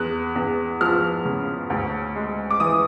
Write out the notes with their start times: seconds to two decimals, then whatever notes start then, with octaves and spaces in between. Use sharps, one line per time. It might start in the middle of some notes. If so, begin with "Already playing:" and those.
Already playing: E2 F#6
0.36 E2
0.81 F3 F6
1.25 C#3
1.70 D2
2.15 G#3
2.51 D6
2.60 E3 D#6